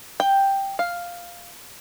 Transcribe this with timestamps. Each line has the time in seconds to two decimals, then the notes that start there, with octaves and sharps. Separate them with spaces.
0.20 G5
0.79 F5